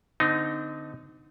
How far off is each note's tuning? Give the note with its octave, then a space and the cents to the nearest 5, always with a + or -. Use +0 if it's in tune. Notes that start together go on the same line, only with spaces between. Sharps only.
D3 +0 C4 -35 D#4 +0